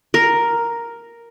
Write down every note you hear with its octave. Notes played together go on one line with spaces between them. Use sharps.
A#4